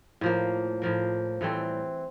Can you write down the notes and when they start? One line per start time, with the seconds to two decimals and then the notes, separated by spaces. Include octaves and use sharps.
0.21 A2 F3 A#3
0.82 A2 F3 A#3
1.41 A2 E3 G3 C4 A4